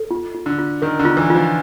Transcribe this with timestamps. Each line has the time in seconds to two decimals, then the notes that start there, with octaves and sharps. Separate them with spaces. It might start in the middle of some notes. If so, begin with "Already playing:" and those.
Already playing: A4
0.11 F4
0.35 F4
0.46 D3
0.59 F4
0.82 D#3 A#4
0.99 D3
1.05 F4
1.17 E3
1.30 F3 F4